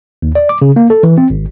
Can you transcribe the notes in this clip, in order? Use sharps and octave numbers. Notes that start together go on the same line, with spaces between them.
D#2
D5
D6
C#3
A#3
A4
E3
C4
G#1